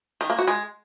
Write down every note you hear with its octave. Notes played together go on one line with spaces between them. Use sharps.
D#3
A#3
F#4
G#3